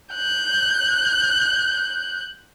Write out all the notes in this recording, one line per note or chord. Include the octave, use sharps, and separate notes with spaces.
F#6 G6